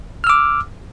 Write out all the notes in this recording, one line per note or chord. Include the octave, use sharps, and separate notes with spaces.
D6 E6 F6